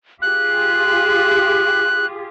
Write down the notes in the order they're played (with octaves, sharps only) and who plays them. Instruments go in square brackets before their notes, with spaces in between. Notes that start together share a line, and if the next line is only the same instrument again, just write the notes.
[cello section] F4 G4 G#4 [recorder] F#6